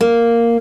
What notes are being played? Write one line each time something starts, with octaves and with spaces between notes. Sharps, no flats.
A#3